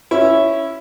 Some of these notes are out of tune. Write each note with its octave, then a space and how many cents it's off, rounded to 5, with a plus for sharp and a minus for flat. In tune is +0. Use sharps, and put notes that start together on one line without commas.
C#4 +0 E4 +0